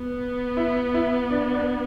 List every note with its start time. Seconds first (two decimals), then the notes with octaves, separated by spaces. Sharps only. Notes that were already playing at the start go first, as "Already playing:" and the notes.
Already playing: B3
0.57 E4
0.94 E4
1.30 D4
1.54 D4